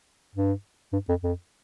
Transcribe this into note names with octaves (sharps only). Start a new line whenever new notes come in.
G2
G2
F2
F2